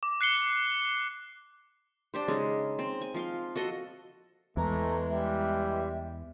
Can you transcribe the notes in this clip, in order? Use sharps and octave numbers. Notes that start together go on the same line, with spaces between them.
D6
F#6 C7 C#7 G7
D4 G4 C5
C#3 G#3 C#4 D#4
C4
G#5
F3 F5 C6
F#4 A4 D#5 C6
E2 E3 G#3 A3 A#5
G3 E5